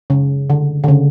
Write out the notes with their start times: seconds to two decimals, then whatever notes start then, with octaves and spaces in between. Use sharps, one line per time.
0.10 C#3
0.50 D3
0.84 D3
0.88 C#3